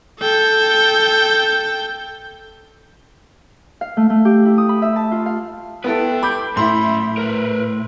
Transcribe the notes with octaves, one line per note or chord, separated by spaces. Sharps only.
A4 G5
F5
A3
A3
G4
E4
D#6
B5
E5
A5
F4
F5
B3 E4 A4 B4 G5
B5 D6 G6
F#2 A2 E4 B5 C6
A#4 B4